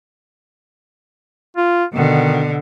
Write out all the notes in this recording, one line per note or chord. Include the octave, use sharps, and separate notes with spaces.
F4
B2 D3 D#3